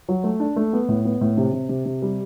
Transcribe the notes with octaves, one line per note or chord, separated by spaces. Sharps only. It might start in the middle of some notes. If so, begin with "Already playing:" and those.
F#3
A3
D4
A3
B3
A2
B3
A2
C3
C3
C3
C3
G3